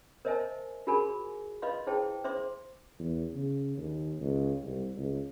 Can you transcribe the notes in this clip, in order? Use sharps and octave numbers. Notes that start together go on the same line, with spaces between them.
A#4 C5 D#5 E5 G#5 A5
F4 F#4 G#4 A#4 G#5 B5
F4 B4 D#5 F5 C6
E4 G#4 C5 G5 A5
C5 E5 C6 D6
E2
C#3
D#2
C#2
C2
C#2